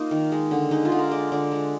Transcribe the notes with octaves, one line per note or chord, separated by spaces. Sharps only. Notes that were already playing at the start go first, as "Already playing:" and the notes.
Already playing: A#3 D#4 F4
D#3
G#3
D3
G#3 D#4
F4
D3
A#4
G#3 D5
D3 D5
G#3